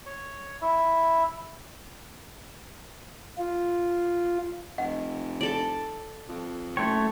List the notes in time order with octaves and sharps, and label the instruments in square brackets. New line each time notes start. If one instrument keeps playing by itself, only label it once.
[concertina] C#5
E4
[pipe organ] F4
[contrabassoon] F1 [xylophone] D#5 F#5
[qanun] A4 D5
[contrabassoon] F2
[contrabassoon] F#1 [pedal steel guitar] A3 C#5 [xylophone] G5 C6